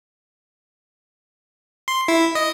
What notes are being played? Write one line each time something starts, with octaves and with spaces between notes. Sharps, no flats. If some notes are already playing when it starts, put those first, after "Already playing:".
C6
E4
D#5